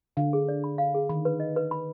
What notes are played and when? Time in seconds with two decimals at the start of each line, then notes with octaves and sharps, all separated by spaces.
0.17 D3 F5
0.33 G#4
0.48 D5
0.64 B5
0.78 F5
0.94 G#4
1.09 D#3 B5
1.25 B4
1.40 D#5
1.56 B4
1.71 B5